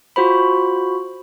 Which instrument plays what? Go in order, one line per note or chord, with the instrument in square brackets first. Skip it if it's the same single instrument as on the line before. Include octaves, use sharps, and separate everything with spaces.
[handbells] F4 F#4 C5 B5